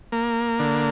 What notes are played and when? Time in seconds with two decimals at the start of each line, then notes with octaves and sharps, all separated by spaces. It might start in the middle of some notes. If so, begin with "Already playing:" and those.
0.12 A#3
0.59 D3